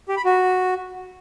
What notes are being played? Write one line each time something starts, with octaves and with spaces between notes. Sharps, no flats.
G4
B5
F#4